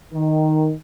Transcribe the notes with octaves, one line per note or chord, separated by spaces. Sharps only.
D#3